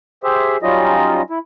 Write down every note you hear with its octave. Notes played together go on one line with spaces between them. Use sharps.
G4 G#4 C5 E5
F#3 G3 C#4 D#4 F4 D#5
E4